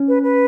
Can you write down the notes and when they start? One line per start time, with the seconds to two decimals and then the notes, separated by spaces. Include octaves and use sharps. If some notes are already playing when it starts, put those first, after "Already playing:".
Already playing: C#4
0.08 B4
0.23 B4